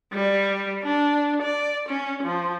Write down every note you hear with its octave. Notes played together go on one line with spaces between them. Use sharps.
G3
D4
D5
C#4
F3